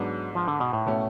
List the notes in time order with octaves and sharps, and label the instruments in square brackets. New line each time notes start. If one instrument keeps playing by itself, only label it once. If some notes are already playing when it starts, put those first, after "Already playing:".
Already playing: [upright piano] G#2 G#3 B3 D4 [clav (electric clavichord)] F#3
[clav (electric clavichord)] F3
D3
B2
A2
[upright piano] B2 A3 C#4